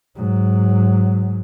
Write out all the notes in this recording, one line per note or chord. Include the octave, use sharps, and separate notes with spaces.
G#2 F#3